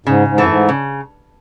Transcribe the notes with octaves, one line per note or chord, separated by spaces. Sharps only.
G#2 C#3
G#2
E3 A3
F#2
G#2
C#3